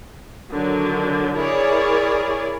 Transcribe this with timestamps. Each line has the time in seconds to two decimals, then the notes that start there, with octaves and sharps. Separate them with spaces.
0.52 D3 D#3 F#3
1.36 E4 G#4 A#4 C#5 D5